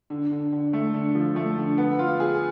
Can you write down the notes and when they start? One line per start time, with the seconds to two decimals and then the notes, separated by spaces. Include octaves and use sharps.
0.10 D3
0.31 D3
0.52 D3
0.73 A3
0.94 D3
1.15 F3
1.36 A3
1.58 D3
1.78 B3
1.99 F4
2.20 G#4